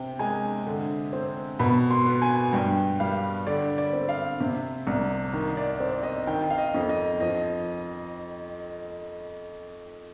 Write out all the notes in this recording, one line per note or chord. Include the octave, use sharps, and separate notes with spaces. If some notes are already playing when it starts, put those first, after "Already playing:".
Already playing: C3 G5
G#3 G#5
D3
C4
B2 B5
C6
B3
G#5
G2 G5
G3 F5
D3 D5
D5
C4
F5
C3
C2
D#3
D5
C4
D#5
D#3 G5
F5
D#5
F2
D#5
F3 D#5